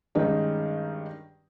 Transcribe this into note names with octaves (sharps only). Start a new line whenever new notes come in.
G2 D#3 G#3 C#4 D#4